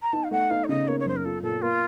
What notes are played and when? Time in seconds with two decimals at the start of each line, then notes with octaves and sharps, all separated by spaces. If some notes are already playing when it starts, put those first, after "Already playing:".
0.02 A#5
0.13 D#4 A5
0.24 F5
0.31 A3 F#5
0.50 D#4 F5
0.64 C#5
0.69 C#3 D#5
0.88 A#3 C#5
1.00 C#5
1.06 F#2 C5
1.16 A#4
1.24 F4 A4
1.43 A#2 A4
1.62 A#3 F4